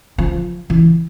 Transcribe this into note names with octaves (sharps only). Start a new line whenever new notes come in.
F3
E3